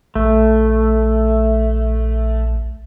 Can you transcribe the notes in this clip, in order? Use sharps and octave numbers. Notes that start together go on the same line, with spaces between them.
A#1 A3